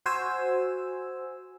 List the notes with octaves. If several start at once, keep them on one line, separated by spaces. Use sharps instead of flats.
F#4 C5 G#5 E6